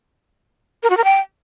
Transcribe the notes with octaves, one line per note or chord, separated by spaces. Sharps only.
A#4
F#4
A#4
G5